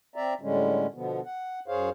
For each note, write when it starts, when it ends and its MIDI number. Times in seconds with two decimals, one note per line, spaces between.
0.16 0.34 60
0.16 0.34 74
0.16 0.34 76
0.16 0.34 82
0.41 0.86 45
0.41 0.86 50
0.41 0.86 55
0.41 0.86 56
0.41 0.86 61
0.94 1.20 47
0.94 1.20 50
0.94 1.20 53
0.94 1.20 59
1.25 1.60 78
1.68 1.89 42
1.68 1.89 68
1.68 1.89 72
1.68 1.89 73
1.68 1.89 77